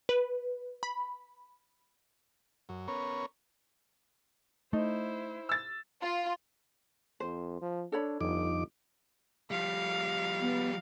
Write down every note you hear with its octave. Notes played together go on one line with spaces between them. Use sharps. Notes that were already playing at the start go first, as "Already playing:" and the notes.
B4
B5
F#2
B3 C#4 A#4 C#5
A3 D#4 E4 C5
E6 A6
F4
F2 C5
F3
D4 A4 C#5 B5
G1 F2 D#4 D6
F3 G3 F5
B3